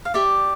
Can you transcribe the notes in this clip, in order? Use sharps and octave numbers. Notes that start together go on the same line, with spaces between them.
F5
G4 D5 E5